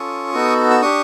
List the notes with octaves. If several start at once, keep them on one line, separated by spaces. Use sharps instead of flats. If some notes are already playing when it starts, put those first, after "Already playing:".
Already playing: C#4 F4 A4 C#6 D#6
B3 D#4 F#4 A4
E6
D4 G4 C#6 D#6